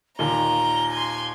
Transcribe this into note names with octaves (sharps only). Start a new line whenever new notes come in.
D#2 A#2 A#5 G7
G#5 C6